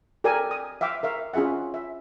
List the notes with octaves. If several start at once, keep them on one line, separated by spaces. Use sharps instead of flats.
G4 A4 A#4 D5 G#5
D#6
E5 F5 G5 D6
A#4 E5 F5 C#6
C#4 F4 G#4 E5 F#5
E5